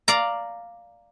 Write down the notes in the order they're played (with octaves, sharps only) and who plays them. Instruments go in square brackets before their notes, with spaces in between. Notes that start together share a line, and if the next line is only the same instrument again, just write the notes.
[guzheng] D5 F5 A#5